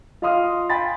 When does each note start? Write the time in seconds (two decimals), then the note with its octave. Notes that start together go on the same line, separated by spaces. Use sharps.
0.22 F4 D#5 F5 C6 D#6 F6
0.70 G5 G#5 B5 C6 A6